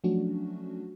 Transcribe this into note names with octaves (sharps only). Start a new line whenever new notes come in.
F3 F#3 A3 C#4 D4 F#4